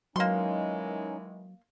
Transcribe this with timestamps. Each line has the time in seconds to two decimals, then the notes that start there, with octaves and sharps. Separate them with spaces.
0.16 D#3 E3 F#3 G#3 A#3 C#4 D#4 C6